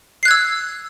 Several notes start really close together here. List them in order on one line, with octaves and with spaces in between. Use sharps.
C7 F#6 G#6 E6